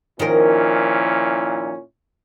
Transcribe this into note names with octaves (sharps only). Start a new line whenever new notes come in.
A#2 D#3 F3 C#4 E4 A#4